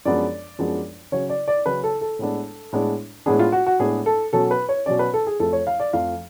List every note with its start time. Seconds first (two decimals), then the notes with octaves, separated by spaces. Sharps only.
0.05 F#2 F3 G#3 B3 D4 D5
0.59 F#2 F3 G#3 B3 D4
1.12 C#3 F#3 C#4 C#5
1.30 D5
1.48 D5
1.66 C#3 F#3 C#4 B4
1.84 A4
2.01 A4
2.19 A2 G#3 B3 D4
2.73 A2 G#3 B3 D4
3.26 A2 G#3 B3 D4 G#4
3.39 F4
3.52 F#4
3.66 F#4
3.79 A2 G#3 B3 D4 G#4
4.06 A4
4.33 B2 F#3 C#4 A4
4.51 B4
4.69 C#5
4.86 B2 F#3 C#4 D5
4.99 B4
5.14 A4
5.27 G#4
5.40 F2 F3 A3 A4
5.53 C#5
5.67 F5
5.80 D5
5.93 F2 F3 A3 F5